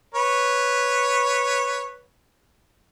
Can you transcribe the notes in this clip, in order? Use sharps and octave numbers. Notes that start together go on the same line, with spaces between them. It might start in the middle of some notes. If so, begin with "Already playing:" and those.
B4 C#5